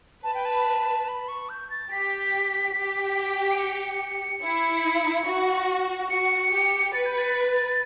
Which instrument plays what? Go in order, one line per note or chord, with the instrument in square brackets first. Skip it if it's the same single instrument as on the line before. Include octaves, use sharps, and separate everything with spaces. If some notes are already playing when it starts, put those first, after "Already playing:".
[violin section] B4 [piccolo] A5
[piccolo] G5
A5
B5
C#6
G6
A6
[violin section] G4 [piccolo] B6
[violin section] G4
[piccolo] D7
C#7
[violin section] E4
F#4
[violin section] F#4 [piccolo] C#7
[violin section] G4
[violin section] B4 [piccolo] A6
[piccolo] G6
A6